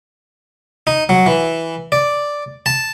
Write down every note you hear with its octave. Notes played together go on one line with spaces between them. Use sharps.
D#4
F#3
E3
D5
A5